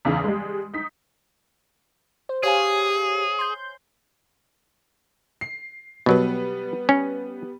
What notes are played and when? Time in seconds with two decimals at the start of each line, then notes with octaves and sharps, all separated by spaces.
0.05 E2 C#3 D#4
0.24 G3 G#3
0.73 D#4 B6
2.29 C5
2.43 G4 G#4 C#5 F5 G#5
3.39 C6 G6
5.41 C7
6.06 B2 F#3 G3 B3
6.89 C#4